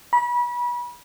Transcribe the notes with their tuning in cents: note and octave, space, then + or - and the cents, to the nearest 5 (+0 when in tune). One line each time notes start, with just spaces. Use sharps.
B5 -30